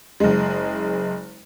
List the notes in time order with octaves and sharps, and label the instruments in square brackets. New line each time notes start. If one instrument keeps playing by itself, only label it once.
[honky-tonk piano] F#1 G#3